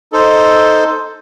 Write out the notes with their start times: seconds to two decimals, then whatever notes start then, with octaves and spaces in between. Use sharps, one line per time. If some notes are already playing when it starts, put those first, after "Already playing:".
0.12 D#4 A4 C5